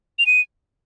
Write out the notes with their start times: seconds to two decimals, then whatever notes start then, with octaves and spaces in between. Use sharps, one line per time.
0.19 F7
0.26 D#7